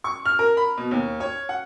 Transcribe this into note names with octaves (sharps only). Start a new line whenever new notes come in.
C#6
F6
A#4
B5
B2
D#2
C#5
F#5